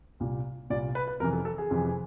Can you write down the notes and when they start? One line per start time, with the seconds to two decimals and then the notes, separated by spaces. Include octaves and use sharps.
0.20 C2 A#2
0.70 C2 A#2 D5
0.95 B4
1.08 B4
1.20 F2 C3 E3 A#4
1.33 A4
1.45 A4
1.58 G#4
1.70 F2 C3 E3